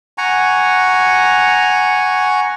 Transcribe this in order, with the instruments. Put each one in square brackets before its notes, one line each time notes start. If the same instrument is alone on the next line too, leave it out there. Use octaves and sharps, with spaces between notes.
[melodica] F#5 G#5 A#5 C#6